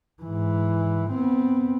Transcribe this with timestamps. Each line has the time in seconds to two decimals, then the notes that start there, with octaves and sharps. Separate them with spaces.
0.22 G#2 E3
1.11 B3 C4